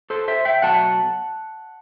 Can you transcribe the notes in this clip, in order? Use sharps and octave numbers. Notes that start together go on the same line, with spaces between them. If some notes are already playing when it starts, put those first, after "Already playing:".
A4 C5
C5 E5
E5 G5
B2 F#3 A3 F#5 A5